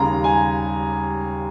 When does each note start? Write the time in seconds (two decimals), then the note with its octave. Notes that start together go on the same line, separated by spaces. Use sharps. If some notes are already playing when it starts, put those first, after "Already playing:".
Already playing: D#2 C#3 G3 A#5
0.24 G#5